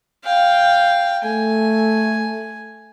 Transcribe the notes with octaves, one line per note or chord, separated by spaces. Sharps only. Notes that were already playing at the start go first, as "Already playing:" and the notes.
F5 G5
A3 G#5